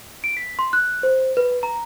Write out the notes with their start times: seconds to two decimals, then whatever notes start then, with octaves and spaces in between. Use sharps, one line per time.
0.24 D7
0.37 B6
0.59 C6
0.73 F#6
1.03 C5
1.37 B4
1.63 A#5